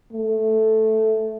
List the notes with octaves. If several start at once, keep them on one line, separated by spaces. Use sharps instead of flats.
A3